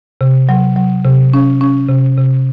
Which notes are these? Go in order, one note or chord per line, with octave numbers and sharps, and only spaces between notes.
C3
F#3
F#3
C3
C#4
C#4
C3
C3